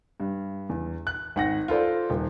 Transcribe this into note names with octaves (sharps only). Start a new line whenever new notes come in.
G2
E2
F#6
G#1 F#5 A#6
F4 A4 C5 D5
D#1